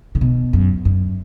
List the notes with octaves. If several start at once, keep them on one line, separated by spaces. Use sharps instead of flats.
C#3
B2
F#2
F#2